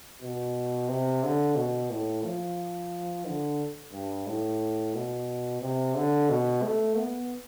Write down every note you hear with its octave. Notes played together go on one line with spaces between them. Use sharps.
B2
C3
D3
B2
A2
F3
D3
G2
A2
B2
C3
D3
B2
A3
B3